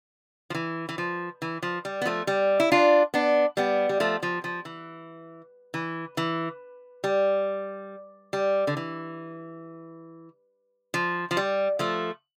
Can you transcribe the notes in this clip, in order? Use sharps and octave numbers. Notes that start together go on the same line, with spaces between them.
F3
E3
E3
F3
E3
F3
G3
B3
F3 A3
G3
E4
D4 F4
B3 D4
G3 B3
G3
F3 A3
F3
F3
E3
E3
E3
G3
G3
D3
E3
F3
F3
G3
F3 A3